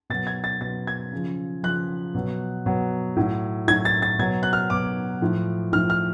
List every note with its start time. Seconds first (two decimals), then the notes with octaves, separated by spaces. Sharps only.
0.10 B2 F#3 A6
0.27 G#6
0.44 A6
0.61 B2 F#3 A6
0.87 G#6
1.13 C#3 F3
1.63 C#3 F3 F#6
2.14 B2 F#3
2.66 B2 F#3
3.17 A2 F#3
3.68 A2 F#3 G#6
3.85 A6
4.02 A6
4.19 B2 F#3 G#6
4.43 F#6
4.53 F6
4.70 B2 F#3 D6
5.21 A2 F3
5.73 A2 F3 F6
5.90 F6